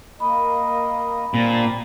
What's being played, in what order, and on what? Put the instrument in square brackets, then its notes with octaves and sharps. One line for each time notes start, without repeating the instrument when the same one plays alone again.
[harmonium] A#3 D#5 [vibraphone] B5
[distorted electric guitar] A#2 [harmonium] G3 C4 D4